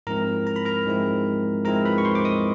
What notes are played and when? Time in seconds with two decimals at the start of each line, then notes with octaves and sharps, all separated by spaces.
0.07 G#2 F3 G#3 C4 E4 A#4 A#5
0.47 A#5
0.56 B5
0.65 A#4 A#5
0.86 G#2 F3 G#3 C4 E4
1.65 G#2 F3 G#3 C4 E4 A#4 A#5
1.85 B4 B5
1.98 C#6
2.05 C5 C6
2.15 D6
2.25 D#5 D#6